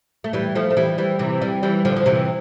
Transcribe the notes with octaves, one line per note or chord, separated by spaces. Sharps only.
A3
E3 G3
F3 A3
A3
E3 G3
E3 G3
C3 E3
E3 G3
E3 G3
D3 F3
F3
C3 E3